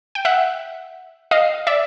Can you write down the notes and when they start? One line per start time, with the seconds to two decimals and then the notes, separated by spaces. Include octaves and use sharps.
0.15 G5
0.25 E5 F#5
1.31 D#5 F5
1.67 D5 E5